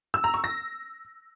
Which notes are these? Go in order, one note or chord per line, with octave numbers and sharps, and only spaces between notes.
E6
A#5
C#6
A#6